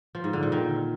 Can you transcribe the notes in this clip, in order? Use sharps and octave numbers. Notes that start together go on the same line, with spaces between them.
F3
G#2
D3
A#2
D#3